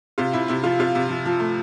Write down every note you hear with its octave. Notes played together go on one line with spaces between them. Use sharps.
C3 F4
C3 E4
C3 E4
F3 F4
C3 F4
C3
F3
F3
A3